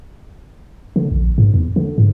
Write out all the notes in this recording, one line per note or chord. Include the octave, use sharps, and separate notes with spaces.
D3
A#1
G#2
E2
D3
G#2